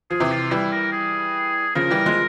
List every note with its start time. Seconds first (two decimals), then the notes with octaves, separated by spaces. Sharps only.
0.10 F3 G#4
0.20 C3 E3
0.31 F4
0.51 E3 G3 E4
0.72 A#4
0.92 G#4
1.75 C#3 F3 A#4
1.91 E3 G3
2.06 F3 G#3